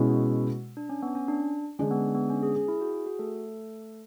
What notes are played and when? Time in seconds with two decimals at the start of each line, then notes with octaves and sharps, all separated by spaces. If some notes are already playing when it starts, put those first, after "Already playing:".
Already playing: B2 G#3 C#4 E4
0.09 F#4
0.77 D4
0.89 C#4
1.02 B3
1.15 C#4
1.28 D4
1.79 D3 G#3 C#4 D4
1.91 B3
2.15 B3
2.30 C#4
2.43 G#4
2.56 G#4
2.68 E4
2.81 F#4
2.94 G#4
3.06 F#4
3.19 A3 A4